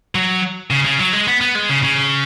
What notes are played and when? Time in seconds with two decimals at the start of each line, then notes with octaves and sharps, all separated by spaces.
0.15 F#3
0.70 C#3
0.85 C#3
0.99 F#3
1.13 G#3
1.27 B3
1.41 B3
1.55 G#3
1.69 C#3
1.83 C#3